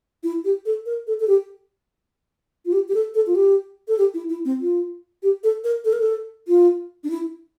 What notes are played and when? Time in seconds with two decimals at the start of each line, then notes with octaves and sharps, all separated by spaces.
0.23 E4
0.44 G4
0.65 A4
0.86 A#4
1.07 A4
1.20 A4
1.27 G4
2.65 F4
2.72 G4
2.88 G4
2.94 A4
3.14 A4
3.26 F4
3.35 G4
3.88 A4
3.98 G4
4.14 E4
4.29 E4
4.45 C4
4.61 F4
5.23 G4
5.43 A4
5.64 A#4
5.85 A4
5.93 A#4
6.00 A4
6.48 F4
7.04 D4
7.10 E4